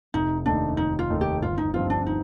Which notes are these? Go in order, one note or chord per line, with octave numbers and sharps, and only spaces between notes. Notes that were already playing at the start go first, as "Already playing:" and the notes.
F1 D#4
D#2 D#3 A3 D4 D#4
F1 D#4
F4
D#2 D#3 A3 D#4
G4
G1 F4
D#4
G2 F3 C4 D#4 F4
D4
D#4